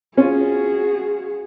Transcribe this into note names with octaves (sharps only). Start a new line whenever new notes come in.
C#4 F4 F#4 G#4